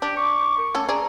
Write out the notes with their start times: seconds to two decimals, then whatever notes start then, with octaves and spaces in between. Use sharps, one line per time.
0.02 D4 G4
0.16 C#6 D6
0.57 A#4
0.75 A3 C#4 A4
0.89 G#4 D5 A#5